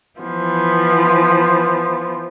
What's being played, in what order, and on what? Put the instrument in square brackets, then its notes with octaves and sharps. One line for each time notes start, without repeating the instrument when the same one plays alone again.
[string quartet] E3 F3 B3